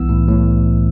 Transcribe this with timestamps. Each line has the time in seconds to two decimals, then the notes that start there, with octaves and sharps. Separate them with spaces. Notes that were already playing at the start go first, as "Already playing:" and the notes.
Already playing: C2 E3 B3 E6
0.09 A2
0.28 A2